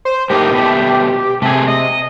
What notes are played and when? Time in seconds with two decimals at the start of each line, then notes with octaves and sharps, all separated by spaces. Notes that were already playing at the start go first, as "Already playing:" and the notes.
0.05 C5
0.30 A2 A#3 D#4 G4
0.51 B2 A3
1.42 C3 A3 G#4
1.68 D#5